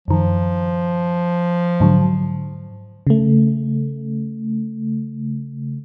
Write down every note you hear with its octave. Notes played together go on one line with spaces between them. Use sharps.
F#2 D#3 F3
G#2 D3 F#3
C#3 A3